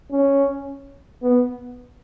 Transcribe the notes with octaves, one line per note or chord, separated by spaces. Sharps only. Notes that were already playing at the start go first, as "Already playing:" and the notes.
C#4
B3